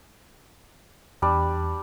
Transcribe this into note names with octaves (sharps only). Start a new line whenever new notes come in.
E2 G3 D4 D5